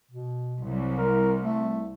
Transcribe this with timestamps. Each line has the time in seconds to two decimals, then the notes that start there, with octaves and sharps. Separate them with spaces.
0.11 B2
0.63 C2 F#3
0.98 A#4
1.42 A3